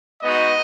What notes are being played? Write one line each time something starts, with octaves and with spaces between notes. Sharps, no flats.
G#3 B3 D#4 F#4 D#5